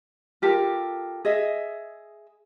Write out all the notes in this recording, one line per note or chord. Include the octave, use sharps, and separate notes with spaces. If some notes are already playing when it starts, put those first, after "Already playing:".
F4 G4 A4 A#4
G#4 D#5 E5